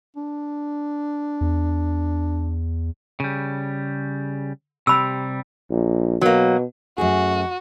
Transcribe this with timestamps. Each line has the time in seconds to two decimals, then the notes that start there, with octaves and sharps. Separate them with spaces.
0.16 D4
1.41 E2
3.20 C#3 G3
4.87 C3 G3 B5 E6
5.71 A#1
6.21 B2 F#3 A#3
6.98 F#2 A3 F#4 G#4